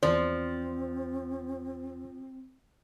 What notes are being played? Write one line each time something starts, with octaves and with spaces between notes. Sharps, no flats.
E2 F3 C4 C5 D5